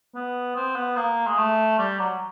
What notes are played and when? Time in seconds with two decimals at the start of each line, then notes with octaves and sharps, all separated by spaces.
0.15 B3
0.56 C4
0.76 B3
0.96 A#3
1.27 G#3
1.38 A3
1.78 G3
1.99 F#3